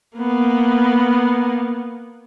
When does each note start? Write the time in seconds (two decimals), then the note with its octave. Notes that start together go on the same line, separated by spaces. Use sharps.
0.17 A#3 B3